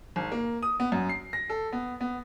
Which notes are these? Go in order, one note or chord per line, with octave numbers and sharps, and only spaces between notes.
G#1
A#3
D#6
B3
F#2
C7
A#6
A4
B3
B3